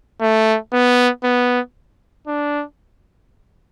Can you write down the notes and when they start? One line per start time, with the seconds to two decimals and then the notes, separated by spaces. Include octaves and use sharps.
0.21 A3
0.73 B3
1.24 B3
2.27 D4